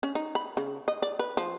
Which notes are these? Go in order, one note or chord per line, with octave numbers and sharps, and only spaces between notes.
C#4
D#4
B5
C#3
D#5
D5
B4
F3